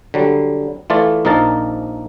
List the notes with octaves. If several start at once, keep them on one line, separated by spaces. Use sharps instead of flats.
D3 F#3 G3
E3 A3 F4 D5
A#1 F3 D#4 A#4 D5 A5